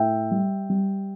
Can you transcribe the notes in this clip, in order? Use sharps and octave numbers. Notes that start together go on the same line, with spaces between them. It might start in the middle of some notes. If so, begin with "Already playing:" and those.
Already playing: A2 E5 G5
G3
G3